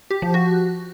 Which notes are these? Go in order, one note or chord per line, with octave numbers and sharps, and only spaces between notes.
G4
F3
F#4